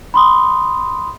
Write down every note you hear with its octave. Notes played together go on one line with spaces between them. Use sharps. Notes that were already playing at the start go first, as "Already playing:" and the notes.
B5 C6 D#6